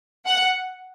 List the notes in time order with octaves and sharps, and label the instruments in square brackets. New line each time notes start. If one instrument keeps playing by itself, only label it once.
[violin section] F#5